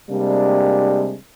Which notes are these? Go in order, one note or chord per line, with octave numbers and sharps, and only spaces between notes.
C3 G3 G#3 A#3 D4